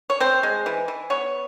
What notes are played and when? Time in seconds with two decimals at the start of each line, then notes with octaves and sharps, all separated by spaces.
0.10 C#5
0.20 C4 C5
0.43 G#3
0.66 E3
0.88 E3
1.10 B3 C#5